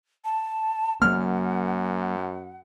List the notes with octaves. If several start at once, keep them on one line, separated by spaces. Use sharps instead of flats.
A5
F#2 F#3 A#3 F#5 F6